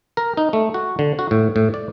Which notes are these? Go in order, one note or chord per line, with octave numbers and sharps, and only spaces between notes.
A#4
D#4
A3
F#4
D3
F#4
A2
A2
D5